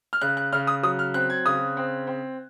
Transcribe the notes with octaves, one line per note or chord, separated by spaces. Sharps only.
F6
C#3 F#6
F#6
C#3 F6
D#6
F#3 D#6
F6
C4 F#6
G#6
C#3 D#6
C4
C4